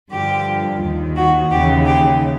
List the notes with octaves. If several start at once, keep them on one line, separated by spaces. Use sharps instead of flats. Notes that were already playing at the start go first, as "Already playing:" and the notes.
G2 D3 F3 G4
D#2 D#3
F#4
D#2 C#3 E3 G4
G4